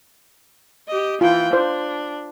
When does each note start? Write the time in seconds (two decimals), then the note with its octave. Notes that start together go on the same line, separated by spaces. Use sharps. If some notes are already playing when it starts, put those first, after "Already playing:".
0.88 G4 D#5
1.21 E3 F4 G5
1.53 D4 C5